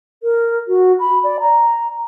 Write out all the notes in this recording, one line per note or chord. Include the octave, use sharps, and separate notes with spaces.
A#4
F#4
B5
D5
A#5